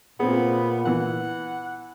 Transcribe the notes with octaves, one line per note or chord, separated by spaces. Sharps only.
A#2 B3 C4 G#4
E3 B3 F#5